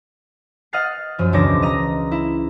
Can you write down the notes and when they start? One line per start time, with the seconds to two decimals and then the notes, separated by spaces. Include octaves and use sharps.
0.73 D#5 F5 F#5 F6 A6 C7
1.18 F#2 F3
1.33 E1 C#2 D4 C#5 D6 A#6
1.62 D#5 A#5 A#6
2.11 E4